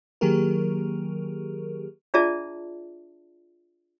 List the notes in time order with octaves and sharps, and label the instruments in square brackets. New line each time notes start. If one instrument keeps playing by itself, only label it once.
[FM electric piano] D#3 F#3 A#3 G4 G#4 A#4
[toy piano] D4 F4 G#4 D5 E5 A5